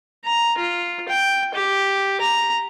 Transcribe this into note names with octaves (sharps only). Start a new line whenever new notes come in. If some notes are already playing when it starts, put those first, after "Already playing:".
A#5
F4
G5
G4
A#5